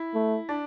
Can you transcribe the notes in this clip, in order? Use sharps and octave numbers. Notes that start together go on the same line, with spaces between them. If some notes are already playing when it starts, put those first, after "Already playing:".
Already playing: E4
A3
D4